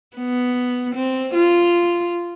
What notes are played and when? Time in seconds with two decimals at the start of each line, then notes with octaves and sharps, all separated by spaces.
0.17 B3
0.95 C4
1.34 F4